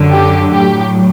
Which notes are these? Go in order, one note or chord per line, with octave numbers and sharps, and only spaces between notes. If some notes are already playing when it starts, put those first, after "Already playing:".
Already playing: F#2 D3 F#3
G4
A2 F#3 G4